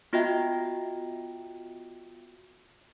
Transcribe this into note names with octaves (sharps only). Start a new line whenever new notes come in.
B3 F4 F#4 D#5 E5 G5